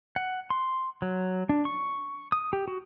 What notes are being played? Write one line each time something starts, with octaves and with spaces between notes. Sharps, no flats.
F#5
C6
F#3
D4
C#6
D#6
G4
F#4